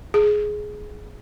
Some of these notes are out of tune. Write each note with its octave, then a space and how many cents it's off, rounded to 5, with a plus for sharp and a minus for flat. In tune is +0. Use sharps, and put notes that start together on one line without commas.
G#4 +10